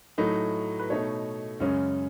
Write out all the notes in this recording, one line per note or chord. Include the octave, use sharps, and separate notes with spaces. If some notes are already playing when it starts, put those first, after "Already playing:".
A2 F#3 A3 D#4
B4
B2 A3 D#4 C#5
F#2 C#3 G#3 C#4